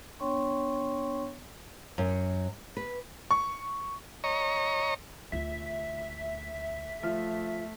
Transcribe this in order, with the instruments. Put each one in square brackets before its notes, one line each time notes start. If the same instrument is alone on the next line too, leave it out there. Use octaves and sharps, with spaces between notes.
[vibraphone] B3 D4 C#5 G5 C6 C#6
[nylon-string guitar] F#2
B4
[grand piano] C#6
[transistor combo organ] C#5 D#5 A#5 C#6
[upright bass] D2 F4 [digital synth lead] E5
[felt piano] F3 F6 [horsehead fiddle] A3